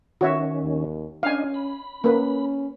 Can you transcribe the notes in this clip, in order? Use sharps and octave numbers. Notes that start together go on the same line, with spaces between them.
D#3 C#4 F#4 C#5 E5
D#2
C#4 D4 D#5 F5 G#5
B5
A#3 C#4 B4